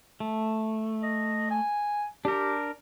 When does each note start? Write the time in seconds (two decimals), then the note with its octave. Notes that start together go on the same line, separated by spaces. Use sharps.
0.20 A3
1.03 D#5
1.51 G#5
2.25 D4 G4 A#4